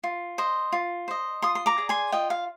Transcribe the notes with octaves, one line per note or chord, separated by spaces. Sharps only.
F4
C5 D#5
F4
C5 D#5
F4 C6 D#6
C6
A#5 D6
G#4 D5
G#5 C6
F4 D#5 G5
F5